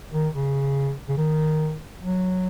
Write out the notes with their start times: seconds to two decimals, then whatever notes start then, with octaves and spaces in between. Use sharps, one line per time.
0.13 D#3
0.33 C#3
1.09 C#3
1.17 D#3
2.01 F#3